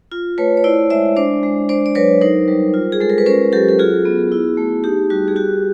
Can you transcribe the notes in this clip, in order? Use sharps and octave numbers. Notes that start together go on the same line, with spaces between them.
F4
A3 B4 C#5
C#5
E4 C5 D5
G#3 D5 E5
D4 C5 D5
G#3
D4 C5 D5
D5
F#3 B4 C#5
D#4 A#4 C5
G3
F4
G#4
G#3 A4
A#4
B4
C#4 A#4 C5
F#3 G4 A4
A4
F4 F#4 G#4
B3
E4
A3
D#4 G4
G3 F#4
G#4
F#4 G4